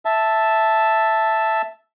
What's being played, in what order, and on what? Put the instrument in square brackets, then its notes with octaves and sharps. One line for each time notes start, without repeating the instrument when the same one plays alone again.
[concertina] E5 A5